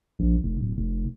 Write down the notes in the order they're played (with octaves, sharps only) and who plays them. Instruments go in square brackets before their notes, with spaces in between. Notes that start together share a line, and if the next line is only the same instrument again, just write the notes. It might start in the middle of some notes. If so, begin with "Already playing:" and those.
[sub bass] A#1
F1
D1
F1